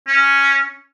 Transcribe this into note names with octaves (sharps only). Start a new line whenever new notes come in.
C#4